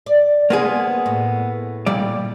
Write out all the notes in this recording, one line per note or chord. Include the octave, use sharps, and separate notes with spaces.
D5
A#3 B3 D4 G#4 C5
A2
A#2 G3 D5